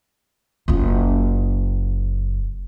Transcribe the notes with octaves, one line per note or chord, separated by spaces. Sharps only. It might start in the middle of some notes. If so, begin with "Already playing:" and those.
F#1 F4